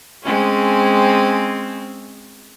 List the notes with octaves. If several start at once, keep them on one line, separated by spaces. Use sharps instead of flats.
G#3 C4 C#4